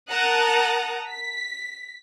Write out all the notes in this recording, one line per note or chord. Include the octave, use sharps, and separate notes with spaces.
A#4 F#5 A5 A#5 D#6 F#6
B6